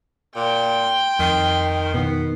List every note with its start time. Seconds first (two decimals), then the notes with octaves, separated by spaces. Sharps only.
0.36 A#2 G5 C6
1.19 F2 D#3 C7
1.94 B2 D#3 B3